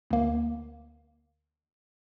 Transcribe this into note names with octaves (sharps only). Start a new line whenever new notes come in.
D2 A#3